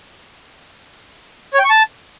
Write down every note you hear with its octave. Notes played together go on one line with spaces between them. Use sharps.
C#5
G5
C#6
A5